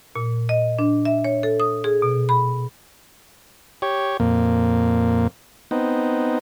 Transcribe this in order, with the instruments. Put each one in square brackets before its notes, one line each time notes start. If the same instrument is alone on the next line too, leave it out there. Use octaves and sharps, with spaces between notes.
[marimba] A#2
D#5
D4
E5
C#5
A4
D#6
G#4
B2
B5
[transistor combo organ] G4 C#5
F2 A#2 A#3
B3 C4 D#4